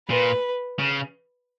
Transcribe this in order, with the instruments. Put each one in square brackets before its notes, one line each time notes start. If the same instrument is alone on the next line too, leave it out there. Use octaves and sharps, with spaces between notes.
[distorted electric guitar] A#2 [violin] B4
[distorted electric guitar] C#3